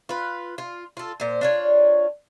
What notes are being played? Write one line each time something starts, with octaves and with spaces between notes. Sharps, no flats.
F4 B4
F4
F4 A4
A#2 C5
D4 F4 C#5